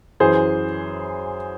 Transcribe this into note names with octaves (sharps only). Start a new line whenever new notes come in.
F#2 E3 G#4 C5